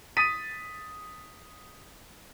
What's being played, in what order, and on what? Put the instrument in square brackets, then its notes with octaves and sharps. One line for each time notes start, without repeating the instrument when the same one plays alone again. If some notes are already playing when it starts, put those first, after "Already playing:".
[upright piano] D#6 A6 B6 D#7